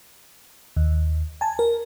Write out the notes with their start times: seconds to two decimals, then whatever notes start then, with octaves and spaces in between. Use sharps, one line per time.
0.77 D#2
1.41 G#5 A5
1.59 A#4